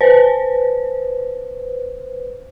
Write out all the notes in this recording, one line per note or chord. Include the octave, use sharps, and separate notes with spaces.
B4 C5